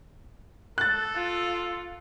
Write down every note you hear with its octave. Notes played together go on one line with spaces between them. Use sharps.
A4 F#6 A6
F4